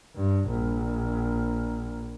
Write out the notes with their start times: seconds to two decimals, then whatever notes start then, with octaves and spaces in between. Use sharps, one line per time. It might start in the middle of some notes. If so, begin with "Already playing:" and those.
0.16 G2
0.49 A#1